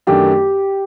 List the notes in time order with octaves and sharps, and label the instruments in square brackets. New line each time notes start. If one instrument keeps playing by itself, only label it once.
[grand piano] F#2 D#3 A3 D4 [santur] G4